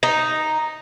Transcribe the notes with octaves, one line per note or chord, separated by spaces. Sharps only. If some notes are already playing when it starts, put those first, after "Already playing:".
D#4